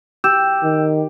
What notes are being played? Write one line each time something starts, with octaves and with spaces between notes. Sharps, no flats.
G4 E6 G6 E7
D#3